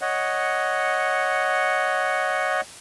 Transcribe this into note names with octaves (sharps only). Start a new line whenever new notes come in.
C#5 D#5 F#5